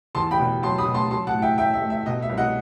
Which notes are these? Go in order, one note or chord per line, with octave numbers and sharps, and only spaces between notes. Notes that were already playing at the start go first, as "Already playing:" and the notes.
E2 A5 C6
G5 B5
B2
F#3 A5 C6
B5 D#6
B2
A5 C6
F#3 A5 C6
F#5 A5
A2
E5 G5
A3 E5 G5
E5
A3
E5
B2 D#5
E5
C2
D#5 F#5